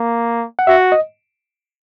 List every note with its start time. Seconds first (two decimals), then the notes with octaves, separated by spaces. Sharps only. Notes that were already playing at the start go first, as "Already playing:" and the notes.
Already playing: A#3
0.59 F#5
0.67 F#4 E5
0.92 D#5